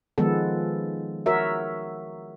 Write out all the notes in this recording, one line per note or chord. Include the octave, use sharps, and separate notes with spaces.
D#3 F3 G#3 B3 A4
F#4 A#4 C#5 E5